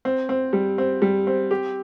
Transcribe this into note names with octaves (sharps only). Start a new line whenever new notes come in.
C4
C4
G3
C4
G3
C4
G4